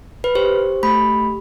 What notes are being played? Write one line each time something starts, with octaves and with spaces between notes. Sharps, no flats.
B4
G4 C5
A3 B5